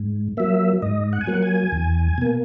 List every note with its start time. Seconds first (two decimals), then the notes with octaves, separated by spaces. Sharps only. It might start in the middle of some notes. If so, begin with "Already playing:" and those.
Already playing: G#2
0.37 F#3 A#3 E5
0.82 G#2 D#5
1.13 F#5
1.21 G#5
1.27 F#3 A#3 F#5
1.43 G#5
1.72 E2
2.18 B2 A#3